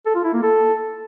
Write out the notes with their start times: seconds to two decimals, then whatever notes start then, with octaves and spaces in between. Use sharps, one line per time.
0.06 A4
0.15 F4
0.24 E4
0.33 A#3
0.43 A4